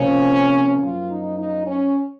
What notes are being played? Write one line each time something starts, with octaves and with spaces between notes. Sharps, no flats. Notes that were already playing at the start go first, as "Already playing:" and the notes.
Already playing: C3 F3 A#3 C#4
F#2 F3 A#3 F4
D#4
D#4
C#4